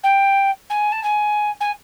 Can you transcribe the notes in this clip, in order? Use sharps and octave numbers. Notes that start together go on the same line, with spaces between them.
G5
G#5
A5
G#5
G#5